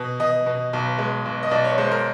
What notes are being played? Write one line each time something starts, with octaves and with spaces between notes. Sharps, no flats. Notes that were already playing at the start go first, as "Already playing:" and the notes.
Already playing: B2
B2 D#5
B2
B1
G#3
B1
D#5
B1 D5
C#5
G#3 C5
A#4